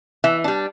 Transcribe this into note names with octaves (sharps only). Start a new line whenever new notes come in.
E3 E5
G3 D4